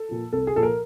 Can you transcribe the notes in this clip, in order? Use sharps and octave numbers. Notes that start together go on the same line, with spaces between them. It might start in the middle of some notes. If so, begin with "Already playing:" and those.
Already playing: A4
A#2 F3
C2 A4
G#4
A#2 F3 A4
A#4